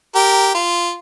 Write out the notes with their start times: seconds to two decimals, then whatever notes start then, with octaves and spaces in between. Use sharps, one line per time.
0.15 G4 A#4
0.55 F4